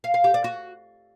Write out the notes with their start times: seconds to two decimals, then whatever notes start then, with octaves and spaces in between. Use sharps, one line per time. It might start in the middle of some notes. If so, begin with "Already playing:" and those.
0.04 F5
0.14 F5
0.24 G4
0.34 D5
0.44 F#4